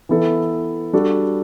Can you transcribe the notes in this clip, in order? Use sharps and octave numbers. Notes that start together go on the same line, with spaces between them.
E3 B3 E4 A4
G3 D4 F#4 A4